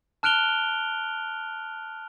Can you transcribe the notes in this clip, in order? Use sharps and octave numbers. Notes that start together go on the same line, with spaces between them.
A5 F6 F#6 D7 F7 G7